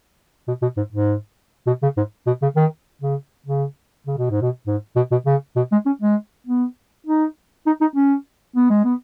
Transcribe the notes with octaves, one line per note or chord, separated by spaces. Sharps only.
B2
B2
G#2
G#2
B2
C#3
G#2
B2
C#3
D#3
C#3
C#3
C#3
B2
G#2
B2
G#2
B2
B2
C#3
B2
G#3
C#4
G#3
B3
D#4
D#4
D#4
C#4
B3
G#3
B3